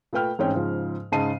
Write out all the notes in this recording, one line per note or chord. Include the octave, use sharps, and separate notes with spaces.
A#2 A3 B4 G5 F6
A1 G#2 C4 C#4 C#5 G5
G#2 C#3 F3
G#2 C#3 D#5 A5 C7 D#7